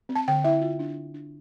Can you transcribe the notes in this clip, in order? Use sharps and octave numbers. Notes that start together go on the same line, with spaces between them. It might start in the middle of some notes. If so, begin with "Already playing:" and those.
C4
A5
D3 G5
E4 E5
F4
D4
D4
D4